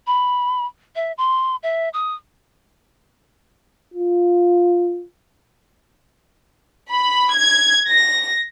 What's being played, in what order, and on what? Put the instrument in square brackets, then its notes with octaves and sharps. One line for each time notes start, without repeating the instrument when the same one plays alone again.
[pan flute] B5
E5
C6
E5
D#6
[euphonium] F4
[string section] B5
G#6
A#6